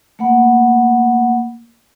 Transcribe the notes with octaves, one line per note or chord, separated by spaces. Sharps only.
A3 A#3 F#5 B5